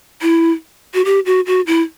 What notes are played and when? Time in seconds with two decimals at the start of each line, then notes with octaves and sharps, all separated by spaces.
0.22 E4
0.94 F#4
1.05 G4
1.26 F#4
1.46 F#4
1.67 E4